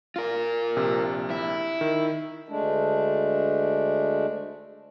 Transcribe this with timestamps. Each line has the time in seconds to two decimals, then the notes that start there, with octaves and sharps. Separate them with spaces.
0.16 F4 A#4
0.76 A#1 C3
1.30 E4
1.81 D#3
2.49 D2 G#3 A3 D4